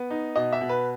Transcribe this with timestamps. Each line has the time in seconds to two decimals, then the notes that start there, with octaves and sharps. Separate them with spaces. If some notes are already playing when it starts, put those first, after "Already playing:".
Already playing: B3
0.10 D#4
0.36 B2 D#5
0.53 E5
0.61 B2
0.69 B4